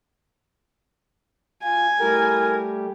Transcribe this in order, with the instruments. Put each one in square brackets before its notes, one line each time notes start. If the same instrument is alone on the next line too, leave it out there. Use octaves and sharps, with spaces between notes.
[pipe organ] F4 [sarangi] G#5
[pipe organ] G3 A3 G4 [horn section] E4 A#4